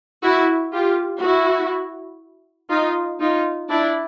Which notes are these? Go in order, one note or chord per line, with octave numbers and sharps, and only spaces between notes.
E4 F#4
F4 G4
E4 F#4
D#4 F4
D#4 F4
D4 E4